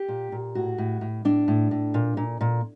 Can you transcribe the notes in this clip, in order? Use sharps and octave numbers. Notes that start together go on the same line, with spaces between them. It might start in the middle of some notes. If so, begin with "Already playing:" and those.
Already playing: G4
A#2
A#2
A2 F#4
A2
A2
A2 D4
A2
A2
A#2
A#2
A#2